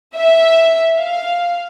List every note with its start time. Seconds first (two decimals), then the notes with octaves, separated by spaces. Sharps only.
0.16 E5
0.98 F5